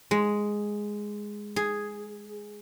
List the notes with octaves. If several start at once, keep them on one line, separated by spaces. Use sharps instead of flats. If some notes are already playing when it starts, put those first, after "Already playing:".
G#3
G#4